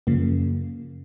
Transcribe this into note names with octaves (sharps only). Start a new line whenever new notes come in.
F#2 C#3 F3 A#3